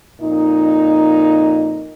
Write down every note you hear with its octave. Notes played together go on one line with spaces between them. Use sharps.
F2 A#2 D#4